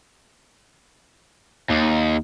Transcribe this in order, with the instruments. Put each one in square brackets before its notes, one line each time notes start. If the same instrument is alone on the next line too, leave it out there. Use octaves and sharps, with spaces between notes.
[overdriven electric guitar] D#2